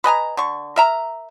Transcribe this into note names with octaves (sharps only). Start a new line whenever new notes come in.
B4 D#5 G#5 A#5
D3 C#6
A#4 E5 A#5